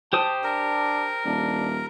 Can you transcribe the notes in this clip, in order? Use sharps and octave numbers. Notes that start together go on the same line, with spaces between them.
G4 C5 A5 D#6
D4 A#4
D#1 D4